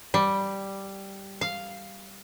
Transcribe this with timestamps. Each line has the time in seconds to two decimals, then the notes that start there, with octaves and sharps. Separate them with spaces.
0.14 G3
1.41 F5